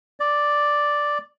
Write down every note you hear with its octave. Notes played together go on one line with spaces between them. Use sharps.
D5